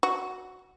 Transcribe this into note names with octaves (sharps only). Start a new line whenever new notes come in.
F#4